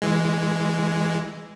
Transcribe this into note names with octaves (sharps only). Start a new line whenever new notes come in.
E3 G#3